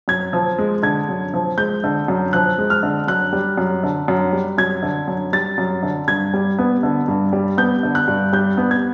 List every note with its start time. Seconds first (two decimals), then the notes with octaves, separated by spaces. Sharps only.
0.08 F#2 G#6
0.33 F3
0.59 G#3
0.83 D3 G#6
1.09 F#2
1.34 F3
1.58 G#3 G6
1.84 D3
2.08 F#2
2.33 F3 F#6
2.58 G#3
2.70 F6
2.83 D3
3.08 F#2 F#6
3.33 G3
3.58 F#2
3.83 D3
4.08 F#2
4.33 G3
4.58 F#2 G#6
4.83 D3
5.08 F#2
5.32 G3 A6
5.58 F#2
5.83 D3
6.08 G2 G#6
6.34 G3
6.58 B3
6.83 D3
7.08 G2
7.33 G3
7.58 B3 G6
7.83 D3
7.95 F#6
8.08 G2
8.33 G3 G6
8.57 B3
8.71 G#6